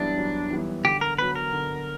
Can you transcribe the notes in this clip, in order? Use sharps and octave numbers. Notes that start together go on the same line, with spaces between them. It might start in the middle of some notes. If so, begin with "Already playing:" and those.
Already playing: F#2 E3 G3 B3 D4 E4
F#2
E3 G3 B3 E4
D3 G4
A#4
F#3 B3 B4
A#4
D3